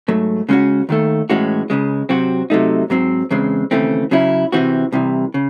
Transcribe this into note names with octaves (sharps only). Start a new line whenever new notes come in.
G#2 F#3 A3
C#3 G#3 C#4 F#4
D#2 D#3 A3
A2 E3 G#3 C#4 F#4
C#2 C#3 G#3
C3 F#3 C4 F#4
C3 F#3 A3 D#4
G#2 F#3 C4
E2 C#3 G#3 C4
D#2 C#3 E3 A3 C4
C#3 F#3 C#4 E4
C3 E3 C4 F#4
C2 C3 E3
C#3